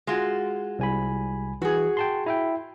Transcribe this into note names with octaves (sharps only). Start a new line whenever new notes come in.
G#3 F4 F#4
C2 G#5 B5
E3 F#4 G#4
G5 A5 C6
E4 E5 G5